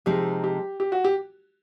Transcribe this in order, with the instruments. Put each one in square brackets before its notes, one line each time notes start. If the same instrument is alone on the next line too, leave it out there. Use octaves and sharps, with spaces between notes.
[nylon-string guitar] C3 F3 G#3 C4 D#4 [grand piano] G4
[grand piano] G4
G4
F#4
G4